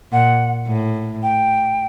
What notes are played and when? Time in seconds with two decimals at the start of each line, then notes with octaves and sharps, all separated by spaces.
0.12 A#2 F#5
0.67 A2
1.23 G5